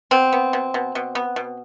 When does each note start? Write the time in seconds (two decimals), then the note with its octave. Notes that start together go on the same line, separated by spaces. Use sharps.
0.11 B2 C4
0.33 B3
0.53 B2
0.74 B2
0.95 B2
1.15 B3
1.36 B2